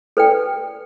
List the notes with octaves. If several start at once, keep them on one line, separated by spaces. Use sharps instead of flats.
A4 B4 D5 G5